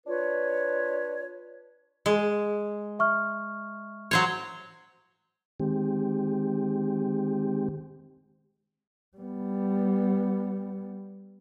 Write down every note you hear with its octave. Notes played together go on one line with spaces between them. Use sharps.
D4 F4 B4 C#5
G#3
E5 C#6 F6
F#3 C5 C#5
D#3 G#3 C4 G4
G3 B3